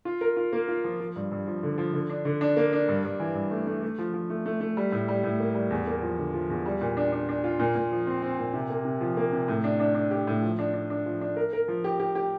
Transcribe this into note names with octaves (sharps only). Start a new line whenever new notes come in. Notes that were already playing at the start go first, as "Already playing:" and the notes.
F4
A#4
F4
A#3
F4
F3
F3
G2
G2
F3
D3
F3
D3
D4
D3
D4
A#3
D4
G2
G2
E3
G2
A3
A3
A3
F3
F3
A3
A3
A3
G3
A2
G3
A2
A#3
G3
E2
A#3
F3
D3
F3
E2
G3
A#2
D4
D4
D4
F4
A#2
A#2
F3
C4
C4
A#2
C3
A#3
C3
F3
A#3
C3
A2
D4
D4
D4
G4
A2
F3
D4
D4
D4
F3
D4
A#4
A#4
F3
G4
G4
G4